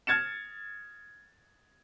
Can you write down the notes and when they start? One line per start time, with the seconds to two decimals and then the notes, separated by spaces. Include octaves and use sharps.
0.07 F6 G#6 A6 C#7 E7